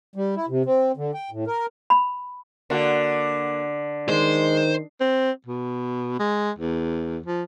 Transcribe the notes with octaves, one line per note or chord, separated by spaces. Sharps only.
G3
E4
C3
C4
D3
G5
A2
A#4
B5
D3 A#3 F#4
D#3 G#3 C5
C4
B2
G#3
E2
F3